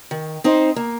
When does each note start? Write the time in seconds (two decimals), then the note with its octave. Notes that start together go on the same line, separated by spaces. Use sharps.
0.11 D#3
0.44 C4 D#4 C5
0.76 A#3